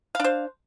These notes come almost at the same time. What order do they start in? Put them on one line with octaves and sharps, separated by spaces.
F5 D4 C5